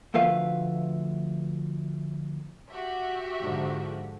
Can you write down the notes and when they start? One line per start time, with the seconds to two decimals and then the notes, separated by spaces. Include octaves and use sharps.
0.14 D2 F3 A3 B4 F5
2.71 F#4 G4 E5
3.40 G#2 D3 F3